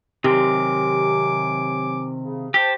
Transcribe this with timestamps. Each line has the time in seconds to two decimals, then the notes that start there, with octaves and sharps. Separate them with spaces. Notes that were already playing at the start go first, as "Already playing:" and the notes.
0.24 C3 D#3 F#3 G4 G#5 D6
2.22 C#3
2.54 G4 C5 A5